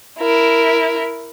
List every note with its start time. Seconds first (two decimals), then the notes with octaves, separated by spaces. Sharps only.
0.20 E4 A#4